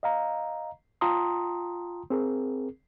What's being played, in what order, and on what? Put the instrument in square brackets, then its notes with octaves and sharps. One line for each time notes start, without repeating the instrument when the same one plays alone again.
[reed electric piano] D#5 F5 A#5
F4 G5 A5 A#5 C6 D#6
C4 G#4 A#4